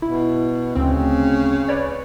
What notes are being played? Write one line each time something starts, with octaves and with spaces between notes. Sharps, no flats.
B2 E4
D2 C#3 C4
B4 C#5 D5